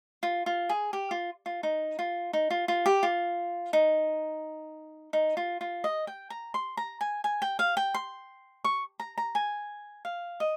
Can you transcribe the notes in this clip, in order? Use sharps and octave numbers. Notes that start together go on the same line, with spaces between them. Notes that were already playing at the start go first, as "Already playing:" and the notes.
F4
F4
G#4
G4
F4
F4
D#4
F4
D#4
F4
F4
G4
F4
D#4
D#4
F4
F4
D#5
G5
A#5
C6
A#5
G#5
G#5
G5
F5
G5
C6
C#6
A#5
A#5
G#5
F5
D#5